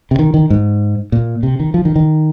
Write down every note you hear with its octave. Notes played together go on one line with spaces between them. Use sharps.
C3
D#3
D#3
G#2
A#2
C3
D#3
F3
D#3
D#3